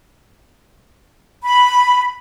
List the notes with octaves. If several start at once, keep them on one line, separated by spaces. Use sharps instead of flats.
B5